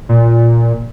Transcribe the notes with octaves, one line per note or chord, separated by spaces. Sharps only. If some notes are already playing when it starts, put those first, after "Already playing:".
A#2